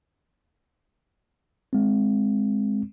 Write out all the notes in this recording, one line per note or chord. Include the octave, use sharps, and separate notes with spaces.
G#3 C4